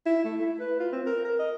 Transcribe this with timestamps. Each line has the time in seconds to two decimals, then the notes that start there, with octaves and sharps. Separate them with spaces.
0.06 E4
0.25 A3
0.41 E4
0.60 B4
0.80 F4
0.92 C4
1.06 A#4
1.25 A#4
1.39 D#5